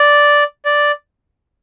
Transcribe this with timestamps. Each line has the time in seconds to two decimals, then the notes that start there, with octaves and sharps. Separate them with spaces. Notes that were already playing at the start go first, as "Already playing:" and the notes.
Already playing: D5
0.66 D5